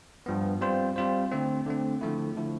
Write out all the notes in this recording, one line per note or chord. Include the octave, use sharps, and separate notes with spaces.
G2 F3 B3
G3 C4 F4 C5
G3 C4 F4 C5
D3 A3 C4
D3 A3 C4
D3 F3 A3 E4
D3 F3 A3 E4